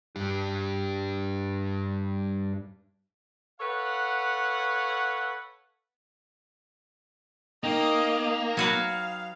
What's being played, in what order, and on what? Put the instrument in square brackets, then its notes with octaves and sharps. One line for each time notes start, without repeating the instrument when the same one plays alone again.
[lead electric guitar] G2 G3
[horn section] A4 B4 C#5 F5 F#5
[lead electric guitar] A#3 [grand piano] D#4 G5 [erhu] D#5
[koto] F#3 F#4 B4 [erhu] F5